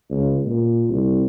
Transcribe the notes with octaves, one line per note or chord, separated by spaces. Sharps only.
C#2
A#2
C2